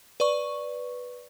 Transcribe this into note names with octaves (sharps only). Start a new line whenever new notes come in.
B4 D5 C#6